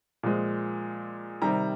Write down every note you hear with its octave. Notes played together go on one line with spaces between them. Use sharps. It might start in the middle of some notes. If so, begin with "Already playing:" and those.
A#2 F3 G#3
C3 D#3 G3 A#5